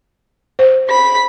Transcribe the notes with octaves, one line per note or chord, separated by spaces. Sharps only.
C5
B5 B6